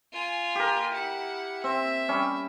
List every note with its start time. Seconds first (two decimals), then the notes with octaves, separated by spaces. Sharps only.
0.13 F4 G#5
0.55 G4 A#4
0.92 E4 F#5
1.64 C4 E5
2.09 G3 C#4